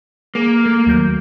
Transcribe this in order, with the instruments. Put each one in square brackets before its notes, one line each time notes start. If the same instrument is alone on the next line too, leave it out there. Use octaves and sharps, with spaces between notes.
[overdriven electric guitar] A#3 [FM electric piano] G#4
[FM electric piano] A3
D#2 F#3 G6